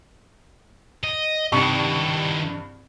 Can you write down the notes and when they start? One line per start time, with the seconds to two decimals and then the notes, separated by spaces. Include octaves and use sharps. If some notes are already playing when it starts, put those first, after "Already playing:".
1.04 D#5
1.52 C2 G2 D#3 E4 C#6